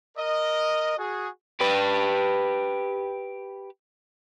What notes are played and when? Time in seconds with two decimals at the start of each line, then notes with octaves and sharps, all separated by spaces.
0.17 A#4 D#5
0.98 F#4 G#4
1.60 G4 B4